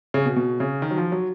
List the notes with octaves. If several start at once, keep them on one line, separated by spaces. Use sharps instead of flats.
C#3
B2
B2
C#3
D#3
F#3
F3
F#3